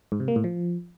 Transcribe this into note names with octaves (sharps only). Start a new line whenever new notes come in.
G#2
C3
A#3
A2
F3